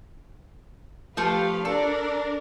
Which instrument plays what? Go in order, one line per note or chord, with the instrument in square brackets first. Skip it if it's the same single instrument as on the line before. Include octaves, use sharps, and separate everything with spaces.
[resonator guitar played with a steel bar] F3 A3 [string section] G4 B4 F5
[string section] D4 A#4 D5 [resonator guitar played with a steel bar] A4